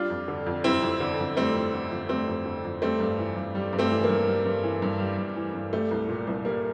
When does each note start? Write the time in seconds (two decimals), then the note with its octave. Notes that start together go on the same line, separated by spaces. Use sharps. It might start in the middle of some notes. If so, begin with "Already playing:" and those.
Already playing: G3 D4 F4
0.10 F2
0.28 D3
0.46 F2
0.64 G3 C4 E4
0.82 F2
1.00 D3
1.18 F2
1.36 G3 A3 C4
1.55 F2
1.73 D3
1.91 F2
2.09 G3 A3 C4
2.28 F2
2.46 D3
2.65 F2
2.82 G3 A3 C4
3.00 G2
3.19 E3
3.36 G2
3.55 G3
3.73 G2
3.79 A3 C4
3.92 E3
4.04 A#3
4.09 G2
4.27 G3
4.46 G2
4.64 E3
4.82 G2
5.00 G3
5.18 G2
5.36 E3
5.54 G2
5.73 G3 A3
5.91 C2
6.09 A#2
6.27 C2
6.45 G3 A#3